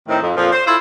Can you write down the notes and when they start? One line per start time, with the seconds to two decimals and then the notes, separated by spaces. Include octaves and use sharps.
0.08 A2 D#3 C4 D#4
0.22 F2
0.35 F2 A#2 F3
0.52 C5
0.66 E4 F4 A4 C5